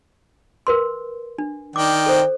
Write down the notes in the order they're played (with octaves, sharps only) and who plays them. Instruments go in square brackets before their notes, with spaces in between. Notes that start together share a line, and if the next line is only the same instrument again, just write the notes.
[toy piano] A#4 B4 C6
D4
[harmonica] D#3 D5 G5 [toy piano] D6
[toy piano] A4 C5